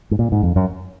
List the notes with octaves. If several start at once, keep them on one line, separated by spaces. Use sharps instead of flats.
G#2
A#2
G#2
F2
F#2